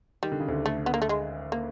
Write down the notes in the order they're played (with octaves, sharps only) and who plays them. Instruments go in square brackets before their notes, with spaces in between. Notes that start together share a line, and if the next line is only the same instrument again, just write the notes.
[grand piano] D#3 [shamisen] G3
[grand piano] D3
C#3
D2 D3
[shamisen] A3
B3
A#3
A3
G#3
A#3